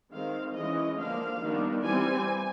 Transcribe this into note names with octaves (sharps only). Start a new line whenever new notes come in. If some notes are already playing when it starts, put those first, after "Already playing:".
D#3 G#3 C4 F5
E3 G#3 C#4 D#5
D3 F3 A#3 D4 F5
D#3 G3 B3 D4
E3 G3 C4 G#5